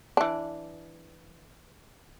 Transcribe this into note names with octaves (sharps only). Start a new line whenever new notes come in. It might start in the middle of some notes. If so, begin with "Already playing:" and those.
E3 D4